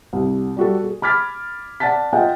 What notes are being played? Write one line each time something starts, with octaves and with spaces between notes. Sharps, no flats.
C2
G3 F#4 A4
G#4
B5 D6 F6 G#6 A6 B6
D5 F#5 A5 A6 B6
F4 G#4 D#5 F#5 G5